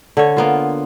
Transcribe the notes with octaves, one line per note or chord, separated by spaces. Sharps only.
D3 C#5
A#3 B3 F4